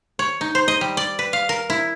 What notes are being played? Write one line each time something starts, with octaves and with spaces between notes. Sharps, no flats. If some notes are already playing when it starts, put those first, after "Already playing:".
C#5
D#4
C5
D#5
G3
D5
B4
F5
A#4
E4